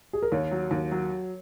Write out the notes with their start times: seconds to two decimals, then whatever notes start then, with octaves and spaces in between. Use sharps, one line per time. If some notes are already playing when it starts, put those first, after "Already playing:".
0.13 G#4
0.23 A#4
0.32 D#2 C#5
0.51 F#3
0.71 D#2
0.91 F#3